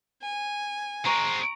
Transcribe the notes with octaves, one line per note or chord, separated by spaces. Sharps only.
G#5
G#3 C4 A#5 C#6